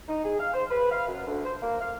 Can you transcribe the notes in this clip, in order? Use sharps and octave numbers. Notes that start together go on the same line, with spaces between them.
D#4
G#4
F5
C5
B4
F5
F#2
D2
C5
A#3
F5